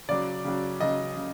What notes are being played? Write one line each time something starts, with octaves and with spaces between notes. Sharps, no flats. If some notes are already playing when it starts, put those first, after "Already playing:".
C#3 F#3 D5
C#3 F#3
C#3 F#3 D#5
C#3